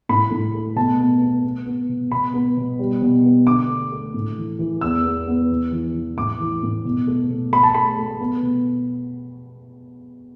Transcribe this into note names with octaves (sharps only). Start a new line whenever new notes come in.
A2 B5
A2
A3
B2 A5
B3
B3
B3
B3
B2
B2 B5
B3
B2
G3
B2
B3
D3 D6
A3
A3
A2
E3
E3
E2 E6
B3
B3
E2
E3
E3
A2 D6
E3
A2
B2
A3
B2
A3 B5
A5
A3 B5
A3
B3
B2